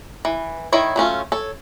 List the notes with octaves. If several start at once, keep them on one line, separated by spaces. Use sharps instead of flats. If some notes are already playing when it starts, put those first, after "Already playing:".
E3
D#3 E4 C#5
F#3 A3 C#4 F4
A4 C#5